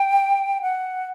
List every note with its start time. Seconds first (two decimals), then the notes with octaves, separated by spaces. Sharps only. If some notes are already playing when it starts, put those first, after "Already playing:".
Already playing: G5
0.62 F#5